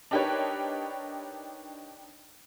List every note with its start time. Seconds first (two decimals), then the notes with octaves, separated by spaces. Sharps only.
0.11 D4 D#4 G4 A#4 B4 C#5